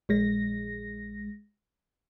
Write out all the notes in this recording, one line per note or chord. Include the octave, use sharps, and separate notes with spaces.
A#1 G#3 A#6